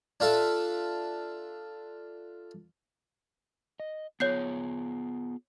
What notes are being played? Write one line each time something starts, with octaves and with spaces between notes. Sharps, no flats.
D4 F4 A4 E5
D#5
B3 F4 G#4 C#5 G6 C7